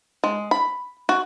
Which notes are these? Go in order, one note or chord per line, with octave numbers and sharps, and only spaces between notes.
G#3
B5
F#4